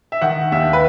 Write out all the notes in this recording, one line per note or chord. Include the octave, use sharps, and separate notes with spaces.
E5
D#3 F#5
D#2 E5
B4